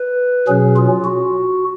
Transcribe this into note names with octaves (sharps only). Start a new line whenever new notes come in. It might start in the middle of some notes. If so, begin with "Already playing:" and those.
Already playing: B4
B2 F#3 C#4 G#4
F4
F#4